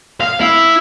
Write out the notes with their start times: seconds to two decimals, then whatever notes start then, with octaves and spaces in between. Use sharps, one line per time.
0.21 F5
0.41 E4